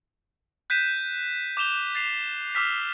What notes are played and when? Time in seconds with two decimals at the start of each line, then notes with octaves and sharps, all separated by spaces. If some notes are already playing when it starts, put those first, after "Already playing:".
0.70 F#6 G6 B6 D#7 E7
1.57 D6 G6 E7 F7 G7
1.95 A6 C7 F7
2.55 D6 E6 F6 B6